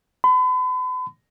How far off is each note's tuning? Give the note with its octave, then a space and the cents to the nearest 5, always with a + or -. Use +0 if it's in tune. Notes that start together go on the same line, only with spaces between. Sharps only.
B5 +40